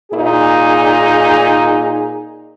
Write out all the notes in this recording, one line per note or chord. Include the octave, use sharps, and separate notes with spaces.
A#2 D#4 G#4